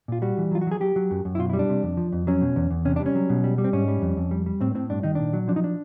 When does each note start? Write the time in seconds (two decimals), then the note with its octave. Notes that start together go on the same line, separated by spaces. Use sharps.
0.08 A#2 F4
0.22 G3 F#4
0.38 E3
0.51 F#3 F4
0.61 F#4
0.67 F#3
0.71 G#4
0.80 F#3 G4
0.96 F#3
1.11 F#2
1.25 F#2
1.35 E4
1.39 B2 F4
1.50 E4
1.53 G3
1.59 D4
1.69 C3
1.83 F2
1.97 F3
2.13 F2
2.27 F#3 C#4
2.41 B2
2.56 E2
2.70 E2
2.85 C3 C#4
2.96 G3 D4
3.06 C#4
3.15 F#3
3.30 B2
3.44 G3
3.58 G3
3.64 C4
3.73 G#2 C#4
3.88 G3
4.02 F2
4.17 F2
4.31 G3
4.46 G3
4.60 A2 C4
4.75 A2 C4
4.90 G2 D4
5.03 D#3 D#4
5.15 A#2 D4
5.33 F#3
5.48 F3 D4
5.56 D#4
5.64 D4